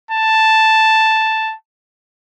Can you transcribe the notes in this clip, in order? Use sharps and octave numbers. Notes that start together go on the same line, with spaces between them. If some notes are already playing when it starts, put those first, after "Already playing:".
A5